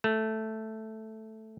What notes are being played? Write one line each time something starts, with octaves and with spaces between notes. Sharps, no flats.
A3